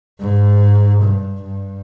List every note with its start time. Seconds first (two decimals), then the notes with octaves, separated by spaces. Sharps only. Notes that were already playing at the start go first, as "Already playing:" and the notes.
0.20 G#2
1.01 G2
1.43 G2